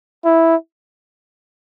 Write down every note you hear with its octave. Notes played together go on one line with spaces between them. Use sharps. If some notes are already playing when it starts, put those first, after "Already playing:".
E4